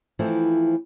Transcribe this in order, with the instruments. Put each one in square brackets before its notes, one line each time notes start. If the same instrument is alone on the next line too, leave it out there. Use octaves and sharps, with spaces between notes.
[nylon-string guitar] E3 F3 A3 C4 E4